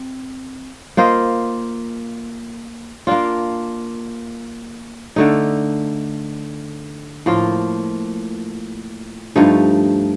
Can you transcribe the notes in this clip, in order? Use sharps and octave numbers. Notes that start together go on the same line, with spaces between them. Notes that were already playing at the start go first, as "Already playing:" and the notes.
Already playing: C4
A#3 F4 C5 D#5
A#3 D4 F4
D3 A3 D#4
A2 F3 A#3 F4
G2 F3 A3 D#4